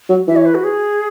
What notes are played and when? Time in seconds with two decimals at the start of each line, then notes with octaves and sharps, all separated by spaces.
0.09 F#3
0.27 E3 E5
0.36 C#5
0.46 B4
0.55 F#4
0.64 G#4